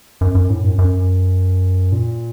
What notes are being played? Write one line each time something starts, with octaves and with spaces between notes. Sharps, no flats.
F#2
F#2
A2
F#2
F#2
A#2